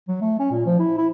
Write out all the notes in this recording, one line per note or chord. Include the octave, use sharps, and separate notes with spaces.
F#3
A3
C#4
A#2
F3
E4
E4